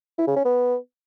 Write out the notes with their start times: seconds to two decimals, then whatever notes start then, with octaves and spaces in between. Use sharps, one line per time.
0.18 E4
0.27 C#3
0.36 C#4
0.45 B3